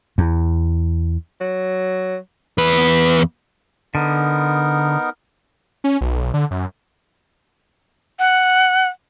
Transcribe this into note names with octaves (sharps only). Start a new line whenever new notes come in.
E2
F#3
E2 B4
D3 B3 D#4 A#4
C#4
B1
B1
D3
F#2
F#5